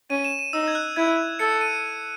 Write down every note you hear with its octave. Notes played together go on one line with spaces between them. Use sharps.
C#4 D#7
E7
D#7
D#4 E6
G#6
F#6
E4 G#6
A4 C#7
D#7